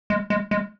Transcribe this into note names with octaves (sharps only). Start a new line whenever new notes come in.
G#3
G#3
G#3